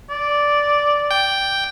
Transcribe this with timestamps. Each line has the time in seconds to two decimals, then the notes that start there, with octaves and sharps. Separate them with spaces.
0.10 D5
1.11 G5